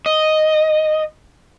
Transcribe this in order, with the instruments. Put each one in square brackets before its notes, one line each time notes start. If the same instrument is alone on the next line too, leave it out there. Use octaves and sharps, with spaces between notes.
[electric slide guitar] D#5